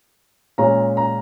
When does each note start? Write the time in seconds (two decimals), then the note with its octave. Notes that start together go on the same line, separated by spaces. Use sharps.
0.58 A#2 G#3 C#4 A#5
0.97 A#5